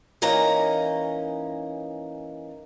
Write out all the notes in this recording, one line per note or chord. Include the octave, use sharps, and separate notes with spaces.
E3 A#3 C#4 D#4 A#5